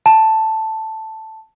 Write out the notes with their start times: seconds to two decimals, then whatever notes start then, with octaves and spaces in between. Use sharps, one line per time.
0.06 A5